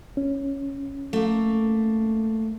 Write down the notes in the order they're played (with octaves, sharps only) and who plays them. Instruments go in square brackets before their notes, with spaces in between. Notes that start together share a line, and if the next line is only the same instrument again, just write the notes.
[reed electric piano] C#4
[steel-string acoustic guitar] A3 A#3